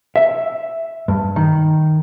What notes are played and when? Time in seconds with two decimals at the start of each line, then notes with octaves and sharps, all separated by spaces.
0.16 E5
1.08 G2
1.36 D#3